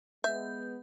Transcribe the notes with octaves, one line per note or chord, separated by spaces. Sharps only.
G#3 B3 E5 G6